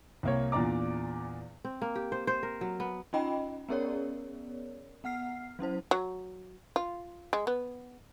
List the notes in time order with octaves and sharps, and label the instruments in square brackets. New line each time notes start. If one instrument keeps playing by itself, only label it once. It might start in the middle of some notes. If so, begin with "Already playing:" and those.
[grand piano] C2 A#3 C#5
E2 A#2 D4 D5 A#5 D6
[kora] C4
A#3
G4
C5
C5
A#4
F#3
B3
[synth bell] C#4 D#4 F4 D#5 G5 B5
B3 C#4 G#4 A#4 C#5 D5
B3 F#5 F6 C7
F#3 C#4 E4 C5
[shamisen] F#3
F4
G#3
B3